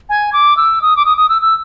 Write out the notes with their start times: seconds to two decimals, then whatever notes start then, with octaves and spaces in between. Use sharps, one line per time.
0.09 G#5
0.33 D6
0.57 E6
0.82 D#6
0.97 D6
1.05 D#6
1.17 D#6
1.29 E6
1.42 E6